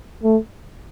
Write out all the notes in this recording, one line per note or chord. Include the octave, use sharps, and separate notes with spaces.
A3